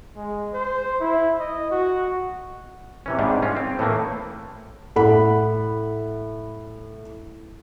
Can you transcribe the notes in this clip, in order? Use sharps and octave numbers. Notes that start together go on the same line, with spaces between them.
G#3
C5
E4
D#5
F#4
C3 E3 C#4
G#2 C3 G3 D4
C#4 F4
C4
A2 E3 A3 A#3
A2 A4 F#5 B5